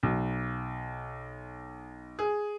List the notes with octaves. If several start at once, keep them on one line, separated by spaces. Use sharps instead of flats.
B1
G#4